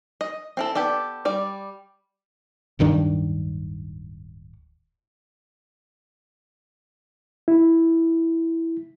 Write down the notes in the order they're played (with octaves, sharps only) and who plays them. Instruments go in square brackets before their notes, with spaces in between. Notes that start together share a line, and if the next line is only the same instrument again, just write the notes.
[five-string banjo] D#5
C4 E4 A4
B3 G4 A4 D5
G3 D5
[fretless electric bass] D1 G2 D#3 D4
[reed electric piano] E4